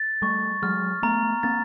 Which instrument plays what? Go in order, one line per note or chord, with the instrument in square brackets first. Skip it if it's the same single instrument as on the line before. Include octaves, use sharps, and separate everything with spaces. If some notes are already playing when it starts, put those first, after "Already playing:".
Already playing: [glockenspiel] A6
[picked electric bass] G3 A3 [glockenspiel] C#6
[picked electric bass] F#3 G#3 [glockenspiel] F6
[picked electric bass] A3 B3 [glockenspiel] A#5
[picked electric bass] A#3 C4 [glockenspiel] A6